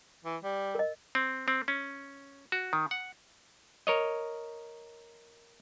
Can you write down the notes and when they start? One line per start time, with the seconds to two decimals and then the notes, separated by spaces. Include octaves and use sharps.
0.25 E3
0.44 G3
0.75 A#4 D#5
1.15 C4
1.48 C4
1.68 C#4
2.52 F#4
2.73 D#3
2.91 F#5
3.87 A#4 C#5 D#5